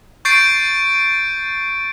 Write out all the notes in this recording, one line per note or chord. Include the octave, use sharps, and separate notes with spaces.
C#6 G6 A6 C7 D7